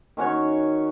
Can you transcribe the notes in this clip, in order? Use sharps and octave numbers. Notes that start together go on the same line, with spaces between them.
D#3 C#4 F#4 C#5